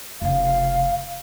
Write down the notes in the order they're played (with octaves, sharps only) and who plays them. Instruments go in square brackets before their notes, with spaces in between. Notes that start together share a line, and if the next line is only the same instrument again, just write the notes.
[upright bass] F1 C#3 [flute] F5